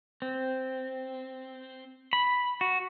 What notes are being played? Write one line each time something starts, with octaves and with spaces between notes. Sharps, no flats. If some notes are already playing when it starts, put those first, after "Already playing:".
C4
B5
F#4